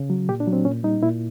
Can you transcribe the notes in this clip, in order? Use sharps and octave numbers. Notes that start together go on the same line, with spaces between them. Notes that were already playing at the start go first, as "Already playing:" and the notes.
Already playing: C#3
F#3
A#2 G4
D4
F#3
C4
A#2 C#4
G3 D#4
A#2 E4